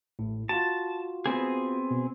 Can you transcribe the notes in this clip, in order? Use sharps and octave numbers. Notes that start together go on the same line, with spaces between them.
A1 A2
F4 F#4 A5
B3 C4 G#4
B2